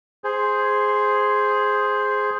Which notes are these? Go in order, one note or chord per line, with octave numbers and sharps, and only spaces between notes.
G#4 C5